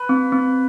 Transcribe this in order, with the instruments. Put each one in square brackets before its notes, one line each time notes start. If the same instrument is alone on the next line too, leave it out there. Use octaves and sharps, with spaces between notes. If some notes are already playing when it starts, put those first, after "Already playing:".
Already playing: [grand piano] B4
[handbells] C4
C4